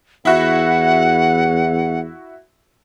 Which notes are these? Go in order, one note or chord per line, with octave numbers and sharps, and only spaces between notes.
E2 E4 F#4 F#5